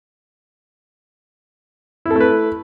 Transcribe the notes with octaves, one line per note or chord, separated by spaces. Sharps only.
A3 E4 A4 B4